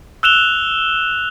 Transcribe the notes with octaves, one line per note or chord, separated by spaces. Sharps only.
E6 F#6 E7 F7 G7